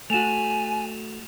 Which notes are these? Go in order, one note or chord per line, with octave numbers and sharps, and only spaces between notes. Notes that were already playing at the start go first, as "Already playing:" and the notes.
A3 F#4 G#5 E7 F7